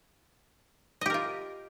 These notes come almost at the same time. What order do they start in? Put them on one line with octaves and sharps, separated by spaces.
D#5 G4 A#4 F4